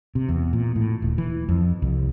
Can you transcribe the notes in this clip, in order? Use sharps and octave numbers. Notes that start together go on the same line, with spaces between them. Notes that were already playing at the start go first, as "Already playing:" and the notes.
C3
E2
A#2
A2
D#1
E3
F2
C2